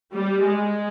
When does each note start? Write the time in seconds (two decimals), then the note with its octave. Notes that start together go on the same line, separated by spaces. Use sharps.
0.14 G3
0.45 G#3